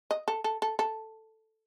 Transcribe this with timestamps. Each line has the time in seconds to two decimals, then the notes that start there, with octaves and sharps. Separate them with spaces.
0.11 D#5
0.28 A4
0.44 A4
0.62 A4
0.79 A4